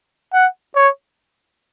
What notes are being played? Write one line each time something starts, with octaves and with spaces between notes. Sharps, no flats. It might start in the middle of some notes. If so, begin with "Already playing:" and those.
F#5
C#5